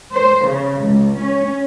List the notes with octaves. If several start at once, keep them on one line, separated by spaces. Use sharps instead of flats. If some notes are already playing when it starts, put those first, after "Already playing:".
C5
C#3
C#2
C#4